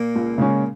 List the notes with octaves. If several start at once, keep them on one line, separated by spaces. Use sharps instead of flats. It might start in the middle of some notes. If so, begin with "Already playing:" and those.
Already playing: A#2 A#3
C#2
C#3 G#3 C#4